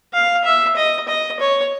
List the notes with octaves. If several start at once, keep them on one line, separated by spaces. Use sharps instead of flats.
F5
E5
D#5
D#5
C#5